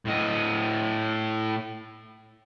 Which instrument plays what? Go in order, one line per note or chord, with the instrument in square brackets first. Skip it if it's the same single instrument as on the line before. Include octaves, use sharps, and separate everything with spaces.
[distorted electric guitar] A2 D#5